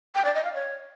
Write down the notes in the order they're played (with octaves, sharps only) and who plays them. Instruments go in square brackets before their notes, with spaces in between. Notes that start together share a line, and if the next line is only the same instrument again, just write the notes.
[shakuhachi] G5
D5
D#5
F5
C#5